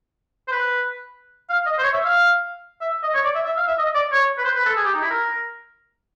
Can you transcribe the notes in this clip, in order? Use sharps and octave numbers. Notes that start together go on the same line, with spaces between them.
C5
B4
F5
D#5
C5
C#5
E5
F5
E5
D#5
C#5
D5
E5
E5
F5
E5
D#5
D5
C#5
B4
C5
B4
A4
G#4
G4
D#4
E4
A#4